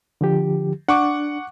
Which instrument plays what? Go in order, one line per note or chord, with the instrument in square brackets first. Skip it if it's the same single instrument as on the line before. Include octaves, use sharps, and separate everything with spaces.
[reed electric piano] D3 F3 G4
[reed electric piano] D4 [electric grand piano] F#5 C#6 D6